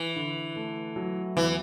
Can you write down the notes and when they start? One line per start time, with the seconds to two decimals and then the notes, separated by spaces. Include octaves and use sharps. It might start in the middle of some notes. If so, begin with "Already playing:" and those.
Already playing: E3 E4
0.16 D3
0.56 A3
0.96 F#3
1.36 E2 E3